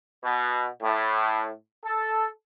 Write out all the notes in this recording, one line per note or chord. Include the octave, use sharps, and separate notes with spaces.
B2
A2
A4